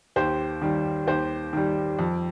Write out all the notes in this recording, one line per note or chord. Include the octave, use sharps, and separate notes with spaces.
D#2 G4 C5
D#3 G3
D#2 G4 C5
D#3 G3
F2